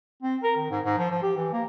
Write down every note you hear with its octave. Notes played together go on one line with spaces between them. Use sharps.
C4
A#4
D#3
G#2
G#2
F3
F3
G4
E3
A#3